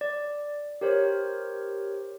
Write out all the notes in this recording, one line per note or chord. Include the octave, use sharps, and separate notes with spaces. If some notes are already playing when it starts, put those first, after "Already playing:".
D5
G4 A#4 C5 C#5